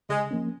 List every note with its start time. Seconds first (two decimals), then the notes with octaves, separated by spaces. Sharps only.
0.09 C#3 G#3
0.31 F3 A#3 C#4